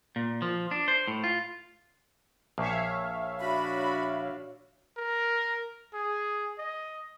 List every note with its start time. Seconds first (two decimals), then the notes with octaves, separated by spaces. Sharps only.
0.16 A#2
0.42 F3
0.71 D4
0.88 C5
1.08 A2
1.24 F4
2.58 A#1 C#5 E5 F5
3.39 D4 F#4 B5
4.98 A#4
5.94 G#4
6.59 D#5